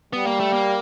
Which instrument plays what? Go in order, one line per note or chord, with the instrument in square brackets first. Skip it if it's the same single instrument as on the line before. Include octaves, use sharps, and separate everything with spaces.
[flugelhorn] G3 [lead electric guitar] B3
[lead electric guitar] A#3
A3
A#3